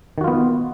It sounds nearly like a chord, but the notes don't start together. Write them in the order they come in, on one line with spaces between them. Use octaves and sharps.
D#3 F#4 F4 B3